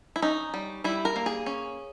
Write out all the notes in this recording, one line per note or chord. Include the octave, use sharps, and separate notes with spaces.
E4
C#4 D#4
G3
G3 E4
A#4
A#3
G#4
C#4